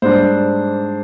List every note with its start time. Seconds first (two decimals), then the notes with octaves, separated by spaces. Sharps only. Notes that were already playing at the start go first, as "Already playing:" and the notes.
0.02 G#2 G3 D4 C5